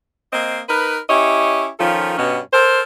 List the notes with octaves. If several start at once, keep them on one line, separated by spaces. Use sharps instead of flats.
A#3 C4 D#5
D#4 A#4 B4
C#4 E4 G4 C#5 D#5
D#3 F3 C#4 F4 A4
G2 B2 B3 C#4
A4 A#4 C5